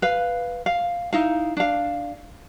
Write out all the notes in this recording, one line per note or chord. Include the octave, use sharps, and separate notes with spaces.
B4 F5
F5
D#4 E4 F5
D4 F5